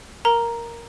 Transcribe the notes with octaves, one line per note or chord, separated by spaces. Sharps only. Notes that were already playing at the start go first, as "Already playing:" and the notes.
A#4 A#5